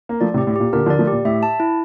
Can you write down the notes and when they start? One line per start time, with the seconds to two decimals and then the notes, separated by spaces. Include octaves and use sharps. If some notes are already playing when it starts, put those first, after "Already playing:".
0.09 A#3
0.21 F3 A3 D5
0.34 A2 C3
0.38 G4
0.47 A2
0.56 A#2 G4
0.73 A#2 D3 A#4
0.86 D3 F3
0.90 D5
0.99 F3 A3
1.07 A#2 G4
1.25 A2 E5
1.43 A5
1.60 E4